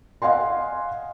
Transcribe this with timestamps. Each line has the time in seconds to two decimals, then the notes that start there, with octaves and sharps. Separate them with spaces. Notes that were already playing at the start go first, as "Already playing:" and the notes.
0.22 D#5 F5 F#5 G#5 C6